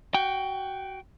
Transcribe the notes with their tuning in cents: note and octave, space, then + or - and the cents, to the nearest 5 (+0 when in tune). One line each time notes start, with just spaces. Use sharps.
F#4 +25 G5 +0